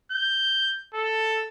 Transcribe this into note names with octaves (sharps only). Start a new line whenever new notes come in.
G6
A4